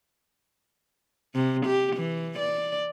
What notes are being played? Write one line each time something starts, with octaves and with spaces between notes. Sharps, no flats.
C3
G4
E3
D5